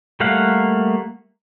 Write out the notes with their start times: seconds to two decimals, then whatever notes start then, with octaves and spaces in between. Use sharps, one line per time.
0.20 G3 A3 A#3 F5 F#5